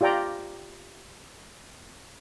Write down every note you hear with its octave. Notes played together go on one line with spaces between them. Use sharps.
F4 G4 D5 G5 A#5